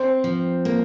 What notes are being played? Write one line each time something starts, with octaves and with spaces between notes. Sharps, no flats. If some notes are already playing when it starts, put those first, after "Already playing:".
Already playing: C4 C5
F3
A#3